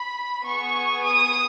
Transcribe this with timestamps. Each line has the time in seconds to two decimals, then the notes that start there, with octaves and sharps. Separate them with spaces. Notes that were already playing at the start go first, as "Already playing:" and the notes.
Already playing: B5
0.44 B3 G#4 C#6
1.04 D#6